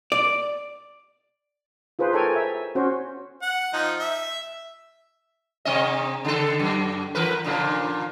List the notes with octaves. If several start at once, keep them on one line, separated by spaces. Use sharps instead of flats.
D5
F4 G#4 B4 C5
A4 A#4 C#5 G5 G#5
E5
C#4 F#4 C5
F#5
F3 D#4
E5
C3 C4 D#5
C#3 A4
F#2
E3 A#4 B4
A#2 C#3 F3